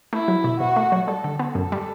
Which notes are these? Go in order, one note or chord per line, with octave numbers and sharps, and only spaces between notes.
A3 E4
F#3
B2
B2 F#4
A3
F#3
G3 A4
D3
B3
F#2 A4
G3